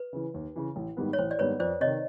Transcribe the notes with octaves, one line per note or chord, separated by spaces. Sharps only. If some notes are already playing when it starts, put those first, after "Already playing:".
Already playing: B4
C#3 E3
D#2
C#3 E3
A1
G#2 D#3 G3 B3
C#5
A1 C5
D5
G#2 D#3 G3 B3 B4 C#5
F2 C5 D5
C3 C#5 D#5
D#3